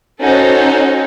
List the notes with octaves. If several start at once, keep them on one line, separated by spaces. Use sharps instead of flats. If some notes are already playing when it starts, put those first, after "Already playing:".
C#4 D#4 F#4 A4 C5 C#5